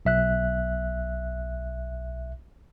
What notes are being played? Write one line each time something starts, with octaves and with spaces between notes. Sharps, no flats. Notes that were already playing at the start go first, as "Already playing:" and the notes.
B1 E5 F#6